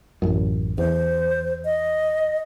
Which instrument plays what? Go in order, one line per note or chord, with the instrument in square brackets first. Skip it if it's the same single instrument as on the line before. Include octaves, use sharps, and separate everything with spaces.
[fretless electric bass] A1 F#2
[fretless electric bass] E2 [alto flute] C5
[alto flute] D#5